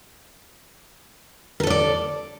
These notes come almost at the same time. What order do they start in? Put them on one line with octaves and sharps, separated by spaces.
A#4 A4 C#5 D5